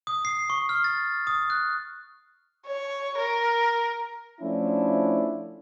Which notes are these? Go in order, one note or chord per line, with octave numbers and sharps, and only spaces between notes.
D#6
C7
C#6
F6
A6
D#6
F#6
C#5
A#4
F3 A3 C#4 D4 E4